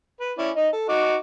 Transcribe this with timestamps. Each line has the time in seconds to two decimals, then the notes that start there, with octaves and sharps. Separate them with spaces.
0.20 B4
0.38 C#4 E4 D5
0.56 D#4 D#5
0.73 A4
0.88 D#4 F#4 D6